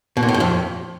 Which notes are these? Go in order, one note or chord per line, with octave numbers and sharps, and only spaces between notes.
B2
A#2
A2
G2
F2